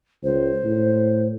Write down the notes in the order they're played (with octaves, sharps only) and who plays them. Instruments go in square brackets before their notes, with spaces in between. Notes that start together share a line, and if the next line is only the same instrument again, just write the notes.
[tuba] C#2 [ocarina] C5
[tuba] A2